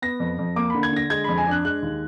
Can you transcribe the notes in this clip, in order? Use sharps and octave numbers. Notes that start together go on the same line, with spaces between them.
B3 A#6
F2
F2
A#3 D6
D3 B5
G#6
D3 A#6
G#3 G#6
F2 B5
G#5
D4 F#6
G#3 F#6
D#2